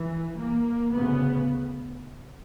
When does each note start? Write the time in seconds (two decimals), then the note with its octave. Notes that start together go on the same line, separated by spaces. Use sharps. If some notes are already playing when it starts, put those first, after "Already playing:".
Already playing: E3
0.38 A#3
0.92 D2 C#3 B3